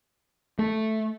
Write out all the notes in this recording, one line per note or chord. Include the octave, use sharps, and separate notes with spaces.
A3